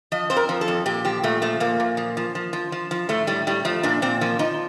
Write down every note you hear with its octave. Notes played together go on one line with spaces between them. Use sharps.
F3 D#5
F2 C5
A#4
F3
A4
F2
A#2 G4
F3 G4
A#2 A3
F3 A3
A#2 A#3
A#2
F3
F3
F3
F3
F3
F3
A2 A3
A2 G3
A2 G3
F3 A3
A#2 D4
A#2 C4
F3 A#3
F3 D#4